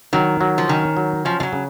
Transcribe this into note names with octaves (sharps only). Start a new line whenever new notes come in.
D#3 F#3
F#3
F3
D#3 C#4
F#3
F3 C#4
F3
F#3
C#3